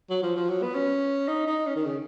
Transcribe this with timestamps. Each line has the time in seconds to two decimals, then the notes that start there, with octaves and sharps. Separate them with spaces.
0.10 F#3
0.23 F3
0.36 F3
0.49 F#3
0.63 B3
0.75 C#4
1.28 D#4
1.47 D#4
1.67 C#4
1.76 D#3
1.86 C#3